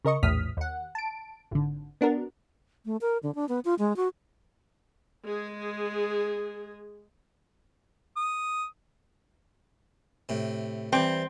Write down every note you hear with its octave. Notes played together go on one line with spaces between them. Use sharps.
C#3 A#4 D#5 C#6
A#1 E2 A2 D#6 F6 B6
D#2 F#5
A5 D7
G#1 D3
B3 D4 F#4 A#4
A3
A#4
D3
D4
B3
F4
G#3
F#4
G#3 G#4
D#6
A2 C3
E3 G3 C4